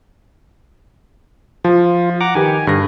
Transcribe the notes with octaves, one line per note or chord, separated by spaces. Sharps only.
F3 F4
F#5 A#5 D6
D#3 G4 B4 G#5
G2 D3 A#6